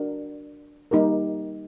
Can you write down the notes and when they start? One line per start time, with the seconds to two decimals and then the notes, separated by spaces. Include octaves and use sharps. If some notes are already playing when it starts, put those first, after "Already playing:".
Already playing: D4 F#4 A#4
0.91 G3 A#3 D#4 G4 A#4